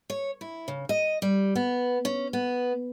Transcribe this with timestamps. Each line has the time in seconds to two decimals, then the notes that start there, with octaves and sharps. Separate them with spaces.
0.10 C#5
0.41 E4
0.68 C#3
0.89 D#5
1.22 G3
1.56 B3
2.05 C#4
2.33 B3